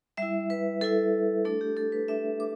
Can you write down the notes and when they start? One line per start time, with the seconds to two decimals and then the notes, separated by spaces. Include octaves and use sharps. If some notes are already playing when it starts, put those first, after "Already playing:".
0.17 G3 E4 E5
0.50 B4
0.81 G3 E4 A4
1.45 A3 D4 A4
1.61 G4
1.77 A4
1.92 B4
2.08 A3 D4 E5
2.40 D6